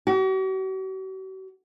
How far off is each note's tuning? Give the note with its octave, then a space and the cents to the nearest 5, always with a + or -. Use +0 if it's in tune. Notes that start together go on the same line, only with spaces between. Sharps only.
F#4 +45